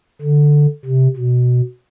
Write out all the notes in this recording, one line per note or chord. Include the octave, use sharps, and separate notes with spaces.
D3
C3
B2